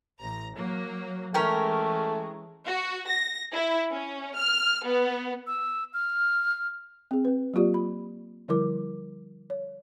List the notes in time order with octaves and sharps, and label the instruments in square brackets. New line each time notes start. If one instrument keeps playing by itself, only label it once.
[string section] A1 A#5 A#6
F#3 A#3
[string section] E3 G#3 [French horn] A3 [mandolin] C#4 A#4 G5
[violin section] F#4
A#6
E4
C#4
F6
B3
[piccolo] E6
F6
[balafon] C4 G#4
C4 B4
F#3 A#3 F4 G4 D5
B5
D3 F3 G3 E4 A#4 D6
C#5